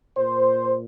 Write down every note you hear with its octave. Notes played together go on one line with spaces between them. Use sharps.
A#2 C5